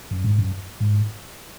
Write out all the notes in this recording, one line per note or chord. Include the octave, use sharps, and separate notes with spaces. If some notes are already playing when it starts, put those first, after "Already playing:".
F#2
G#2
F#2
G#2